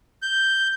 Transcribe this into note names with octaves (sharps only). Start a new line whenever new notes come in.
G6